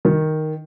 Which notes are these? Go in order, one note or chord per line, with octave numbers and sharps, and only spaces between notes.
D#3